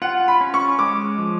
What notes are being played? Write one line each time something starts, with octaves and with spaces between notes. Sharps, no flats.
F4 F#5
B5
C#4
C#6
G#3 D6
F3